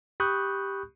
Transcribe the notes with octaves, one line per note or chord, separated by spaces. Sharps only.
G4 B5 C#6 D#6 F#6 G6